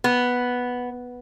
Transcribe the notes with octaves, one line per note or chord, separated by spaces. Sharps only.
B3